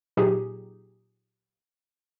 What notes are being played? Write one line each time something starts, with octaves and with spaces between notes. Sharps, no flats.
A#2 F#3 D#4 G4 G#4